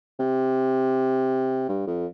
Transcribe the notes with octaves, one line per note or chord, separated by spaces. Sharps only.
C3
G2
F2